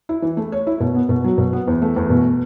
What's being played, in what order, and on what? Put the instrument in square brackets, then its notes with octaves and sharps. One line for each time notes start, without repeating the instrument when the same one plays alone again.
[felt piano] E4
E3
A3
C#5
E4
B2
B3
B2
F#3
B2
B3
E2
A3
E2
B2